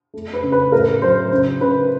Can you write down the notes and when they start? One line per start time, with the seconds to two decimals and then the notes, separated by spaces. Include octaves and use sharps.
0.14 A3
0.33 B4
0.43 C#3
0.52 B4
0.72 A2 A#4
1.02 F#3 C5
1.31 C#3 C5
1.61 C#3 B4